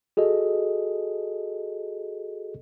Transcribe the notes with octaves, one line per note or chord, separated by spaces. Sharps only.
F#4 G#4 A4 D#5